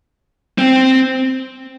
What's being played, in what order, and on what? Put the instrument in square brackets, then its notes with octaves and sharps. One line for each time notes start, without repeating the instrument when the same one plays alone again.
[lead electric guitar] C4